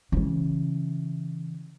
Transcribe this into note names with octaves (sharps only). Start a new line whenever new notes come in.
C#3 E3